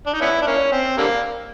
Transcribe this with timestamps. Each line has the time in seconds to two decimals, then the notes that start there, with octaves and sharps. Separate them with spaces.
0.06 D4
0.14 D#4
0.21 B3 C#4 E4
0.42 D4
0.47 A#3 C#4
0.72 C4
0.98 D3 G3 A#3